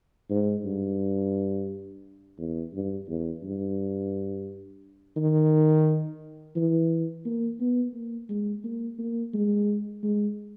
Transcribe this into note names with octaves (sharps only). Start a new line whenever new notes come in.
G#2
G2
E2
G2
E2
G2
D#3
E3
A#3
B3
A#3
G#3
A#3
A#3
G#3
G#3